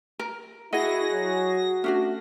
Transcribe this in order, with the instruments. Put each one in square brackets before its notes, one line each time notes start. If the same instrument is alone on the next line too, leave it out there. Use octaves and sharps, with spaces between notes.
[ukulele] A#4
[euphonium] E4 [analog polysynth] F#4 G#4 A#6 [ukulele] D#5 F#5
[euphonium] F#3
[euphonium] A3 [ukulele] C#4 D4 F#4